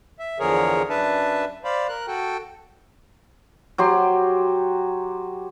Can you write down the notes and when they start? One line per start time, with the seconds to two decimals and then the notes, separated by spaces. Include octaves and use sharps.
0.19 E5
0.39 E2 D3 F3 G#4 A#4 C#5
0.90 F#2 D4 B4 E5 A5
1.64 C5 D5 F5 B5
1.89 A#4 F#6
2.08 F#4 A4 G5
3.78 F#3 G4 C6